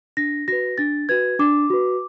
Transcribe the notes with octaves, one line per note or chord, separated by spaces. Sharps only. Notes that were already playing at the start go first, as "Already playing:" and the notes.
D4 A#6
F#4 B4 A#6
D4 A6
F#4 B4 G#6
D4 D6
F#4 B4